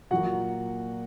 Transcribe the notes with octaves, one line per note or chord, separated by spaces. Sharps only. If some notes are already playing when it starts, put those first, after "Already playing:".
A#2 F#3 A#3 F#4 F#5